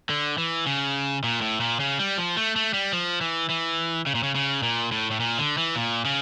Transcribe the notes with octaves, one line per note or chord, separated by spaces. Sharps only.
D3
E3
C#3
A#2
A2
A#2
C#3
G3
F3
A3
A3
G3
F3
E3
E3
C#3
A#2
C#3
C#3
A#2
A2
A2
A#2
D3
E3
A#2
C#3